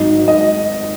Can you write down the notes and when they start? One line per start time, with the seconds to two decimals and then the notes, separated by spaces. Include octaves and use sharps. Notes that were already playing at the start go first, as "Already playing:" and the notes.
Already playing: G#1 G#2 F#3 D#4
0.28 D#5